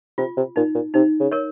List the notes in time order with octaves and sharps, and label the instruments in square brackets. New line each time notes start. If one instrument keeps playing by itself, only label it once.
[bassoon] C3 [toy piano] F4
[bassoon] C3
[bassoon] A#2 [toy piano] D#4
[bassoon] A#2
[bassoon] C3 [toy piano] D#4
[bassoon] C#3
[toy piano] A#4 C#5